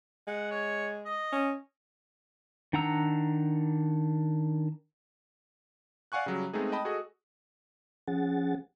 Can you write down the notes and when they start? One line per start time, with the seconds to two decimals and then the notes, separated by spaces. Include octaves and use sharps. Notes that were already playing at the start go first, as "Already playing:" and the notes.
0.27 G#3 F#5
0.51 C#5
1.05 D#5
1.32 C#4
2.73 D#3 D4 F#5 A#5 E6
6.12 D5 F5 F#5 G#5 C#6 F#6
6.26 C#3 F#3 G3
6.53 G#3 A3 B3 C4 D#4 G#4
6.72 D#5 G5 A5 B5
6.85 F#4 G#4 A4 D#5
8.08 F3 C#4 G#4 F#5 A6